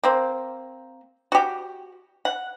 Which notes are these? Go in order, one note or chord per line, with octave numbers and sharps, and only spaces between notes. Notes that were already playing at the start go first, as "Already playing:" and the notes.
A#3 C4
F#4 G4
F#5